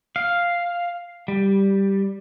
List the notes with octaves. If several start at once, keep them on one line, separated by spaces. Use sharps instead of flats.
F5
G3